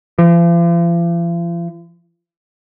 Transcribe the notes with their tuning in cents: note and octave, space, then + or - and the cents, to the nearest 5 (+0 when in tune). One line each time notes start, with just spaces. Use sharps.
F3 -45